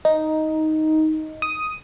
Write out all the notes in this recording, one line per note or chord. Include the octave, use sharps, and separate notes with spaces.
D#4
D#6